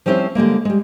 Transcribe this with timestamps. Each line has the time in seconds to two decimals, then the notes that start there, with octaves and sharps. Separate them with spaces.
0.06 F3 G3 C4 C#4 E4 C5
0.35 D3 G3 G#3 A#3
0.65 G3 G#3